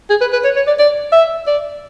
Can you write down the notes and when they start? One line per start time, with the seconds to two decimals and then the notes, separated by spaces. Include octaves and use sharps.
0.10 G#4
0.21 B4
0.33 B4
0.44 C#5
0.56 C#5
0.67 D5
0.79 D5
1.12 E5
1.47 D5